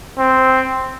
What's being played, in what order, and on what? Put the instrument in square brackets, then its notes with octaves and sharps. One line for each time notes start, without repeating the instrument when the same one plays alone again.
[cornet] C4